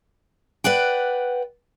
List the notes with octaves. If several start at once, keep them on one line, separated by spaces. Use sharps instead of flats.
B4 D5 F#5 G5